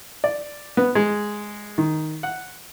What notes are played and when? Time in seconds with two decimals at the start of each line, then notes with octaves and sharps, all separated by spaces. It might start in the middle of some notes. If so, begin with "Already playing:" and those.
0.24 D5
0.77 B3
0.95 G#3
1.78 D#3
2.23 F#5